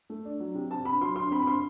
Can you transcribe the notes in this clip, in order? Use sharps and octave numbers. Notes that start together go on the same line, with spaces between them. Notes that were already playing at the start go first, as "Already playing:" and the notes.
A3
D4
F#3
C3
C4 A5
D3 B5
F#3 C6
D3 C6
C4 B5
B5
D3 C6